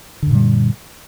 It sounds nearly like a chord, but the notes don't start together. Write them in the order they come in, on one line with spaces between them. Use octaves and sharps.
D3 F#2 A#2 G3